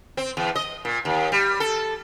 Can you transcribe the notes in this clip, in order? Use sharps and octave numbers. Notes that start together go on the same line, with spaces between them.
C4
E2
D#5
A#2
D#2
G3
A4